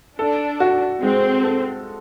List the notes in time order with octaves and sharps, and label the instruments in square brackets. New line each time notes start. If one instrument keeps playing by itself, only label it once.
[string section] D4 [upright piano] A4
[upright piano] F#4
[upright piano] G#3 [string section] C4
[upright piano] A4